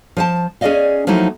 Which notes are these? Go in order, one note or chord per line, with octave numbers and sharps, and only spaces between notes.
F3 C5 A5
C#4 G#4 A4 D5 D#5 F5
F3 F#3 A3 A#3 D#4 E4